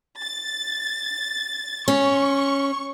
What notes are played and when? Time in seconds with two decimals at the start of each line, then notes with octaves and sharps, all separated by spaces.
0.21 A6
1.88 C#4 C#6